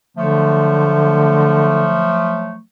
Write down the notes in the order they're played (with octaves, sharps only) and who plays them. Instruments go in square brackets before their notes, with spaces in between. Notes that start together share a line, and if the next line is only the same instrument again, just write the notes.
[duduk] D3 [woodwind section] F3 F#3 A3